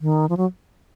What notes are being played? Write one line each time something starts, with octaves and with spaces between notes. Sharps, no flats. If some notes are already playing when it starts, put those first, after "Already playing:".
D#3
F3
F#3